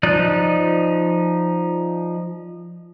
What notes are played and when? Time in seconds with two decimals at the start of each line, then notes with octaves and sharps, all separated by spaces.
0.03 F3 D#4 D5 F#6